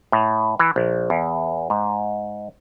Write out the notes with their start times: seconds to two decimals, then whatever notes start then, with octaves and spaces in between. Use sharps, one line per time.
0.12 A2
0.59 E3
0.76 A#1
1.10 E2
1.70 G#2